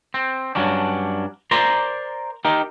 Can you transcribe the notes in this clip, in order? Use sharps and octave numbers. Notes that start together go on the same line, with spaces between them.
C4
G2 F#3 C#4 D4
A#4 C5 D5 A#5 C6
D#4 G4 A#4